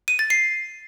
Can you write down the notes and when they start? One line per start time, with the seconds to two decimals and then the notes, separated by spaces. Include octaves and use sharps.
0.08 D#7
0.19 A6
0.30 C7